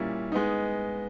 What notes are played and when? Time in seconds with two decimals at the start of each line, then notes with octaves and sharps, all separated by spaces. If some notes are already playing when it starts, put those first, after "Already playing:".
Already playing: A#2 G3 A#3 C#4 E4
0.32 G#3 B3 D#4